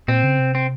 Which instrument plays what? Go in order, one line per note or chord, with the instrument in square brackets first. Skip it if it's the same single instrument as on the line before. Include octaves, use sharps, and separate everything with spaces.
[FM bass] A#2 [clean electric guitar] C4
[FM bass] C#3
C3
[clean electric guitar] C4